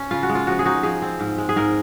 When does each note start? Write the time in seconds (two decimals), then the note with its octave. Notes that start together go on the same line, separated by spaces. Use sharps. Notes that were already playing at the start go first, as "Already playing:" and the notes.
Already playing: C#4
0.11 C#3 F4
0.23 F#4
0.29 G#3
0.35 F4
0.47 F3 F#4
0.59 G#4
0.65 D#4 F#4
0.83 F3 G#4
1.02 C4
1.20 G#2
1.38 G#3
1.49 G#4
1.56 G#2 A#4